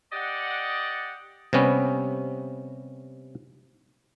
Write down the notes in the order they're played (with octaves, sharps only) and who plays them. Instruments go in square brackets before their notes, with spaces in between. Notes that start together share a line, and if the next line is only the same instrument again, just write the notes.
[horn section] G4 D5 D#5 F#5
[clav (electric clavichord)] C3 G3 B3 C#4